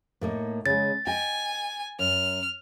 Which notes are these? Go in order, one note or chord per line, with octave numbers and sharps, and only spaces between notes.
A2 A#3 D#4
C#3 G#3 A6
D#5 G5 G#5
F#2 F6